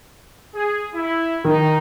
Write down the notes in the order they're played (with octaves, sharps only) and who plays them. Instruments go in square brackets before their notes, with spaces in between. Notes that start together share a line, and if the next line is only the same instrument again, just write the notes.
[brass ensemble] G#4
E4
[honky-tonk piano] D#3 [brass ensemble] D#4